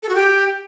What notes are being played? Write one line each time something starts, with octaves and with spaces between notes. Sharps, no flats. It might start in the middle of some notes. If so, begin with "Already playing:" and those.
A4
F#4
G4